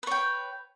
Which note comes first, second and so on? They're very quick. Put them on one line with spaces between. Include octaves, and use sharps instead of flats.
B4 C#5 G5